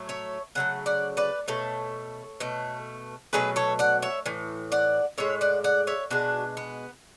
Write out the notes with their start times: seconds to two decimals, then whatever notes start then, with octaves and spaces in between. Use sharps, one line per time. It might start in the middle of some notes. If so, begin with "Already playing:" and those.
Already playing: A2 F#3 A3
0.09 C#5 E5
0.55 C#3 F#3 A3 F#5
0.86 D5 F#5
1.17 B4 D5
1.48 B2 A3 A4 C#5
2.40 B2 A3
3.33 B2 F#3 A3 G#4 B4
3.56 A4 C#5
3.79 D5 F#5
4.02 C#5 E5
4.26 A2 E3
4.72 D5 F#5
5.18 A2 G#3 C#5 E5
5.41 D5 F#5
5.64 D5 F#5
5.87 C#5 E5
6.10 B2 G#3 D4 F#4
6.57 B3